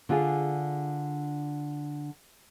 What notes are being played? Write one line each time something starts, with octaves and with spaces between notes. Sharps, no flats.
D3 D4 F4 G#4